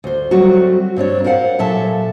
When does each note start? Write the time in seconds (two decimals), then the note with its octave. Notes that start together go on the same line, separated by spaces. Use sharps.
0.04 D2 C5
0.31 F#3 G3 A3 C4 F#4
0.96 G2 C4 D4 C#5
1.24 A#4 C5 F5 F#5
1.59 A#2 F#3 A4 E5 A5